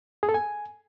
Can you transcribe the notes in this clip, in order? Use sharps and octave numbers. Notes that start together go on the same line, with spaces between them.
G#4
A4
G#5